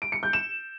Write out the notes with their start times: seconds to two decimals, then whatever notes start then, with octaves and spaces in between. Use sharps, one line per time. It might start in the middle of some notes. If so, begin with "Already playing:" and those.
0.02 D7
0.12 C#7
0.23 G6
0.33 E7